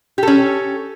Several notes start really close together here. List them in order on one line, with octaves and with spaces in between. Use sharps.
G4 A4 C#4